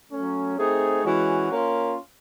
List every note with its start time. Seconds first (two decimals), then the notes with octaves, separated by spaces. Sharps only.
0.11 F#3 A3 C#4
0.58 A3 C4 D#4 G#4
1.03 E3 G#3 C#4 F#4
1.50 A#3 C#4 F4